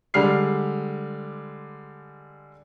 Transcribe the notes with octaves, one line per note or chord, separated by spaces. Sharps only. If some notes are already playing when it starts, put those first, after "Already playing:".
D3 G3 G#3 F6 C7